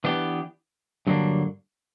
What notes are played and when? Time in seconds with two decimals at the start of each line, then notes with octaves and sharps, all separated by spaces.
0.04 E3 B3 D4 G4
1.07 G2 D3 F#3 A#3 D4